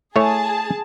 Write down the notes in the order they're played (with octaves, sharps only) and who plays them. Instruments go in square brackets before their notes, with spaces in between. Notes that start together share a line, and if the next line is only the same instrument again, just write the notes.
[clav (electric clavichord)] A3 E4 C#5 [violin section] G#4 A5